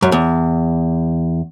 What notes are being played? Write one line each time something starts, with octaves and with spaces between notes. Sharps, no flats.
F#2
E2